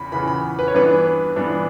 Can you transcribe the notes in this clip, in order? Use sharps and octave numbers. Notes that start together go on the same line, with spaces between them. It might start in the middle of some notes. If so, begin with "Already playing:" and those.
Already playing: E2 C#3 E3 B5
E2 C#3 E3 B5
B5
B4
C#5
G2 E3 B3 D4 B4
G2 E3 B3 D4